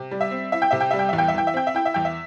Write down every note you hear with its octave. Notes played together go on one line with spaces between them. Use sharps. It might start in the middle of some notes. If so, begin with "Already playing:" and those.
Already playing: C3
G3
E5
C4
E4 E5
G5
C3 E5
G5
G3 E5
G5
E2 E5
G5
E5
E3 G5
E5
C4 G5
E5
E4 G5
E5
E2 G5
E5